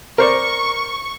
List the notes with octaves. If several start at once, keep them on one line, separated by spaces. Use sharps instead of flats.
A#4 C5 D5 C#6